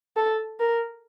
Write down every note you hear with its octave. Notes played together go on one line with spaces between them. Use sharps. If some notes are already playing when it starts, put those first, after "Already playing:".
A4
A#4